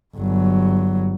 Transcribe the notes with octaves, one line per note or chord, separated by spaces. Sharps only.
G1 F#3